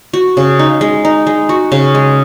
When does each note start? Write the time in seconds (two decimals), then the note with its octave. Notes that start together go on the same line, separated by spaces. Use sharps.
0.13 F#4
0.37 C#3
0.59 D#4
0.81 G#3
1.05 D#4
1.27 G#3
1.49 F#4
1.72 C#3
1.95 G#3